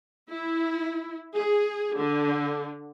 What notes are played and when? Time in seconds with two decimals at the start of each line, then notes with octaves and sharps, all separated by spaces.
0.30 E4
1.36 G#4
1.97 D3